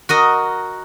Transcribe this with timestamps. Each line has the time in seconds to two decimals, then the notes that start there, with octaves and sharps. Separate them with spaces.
0.09 F#4 A#4 D#5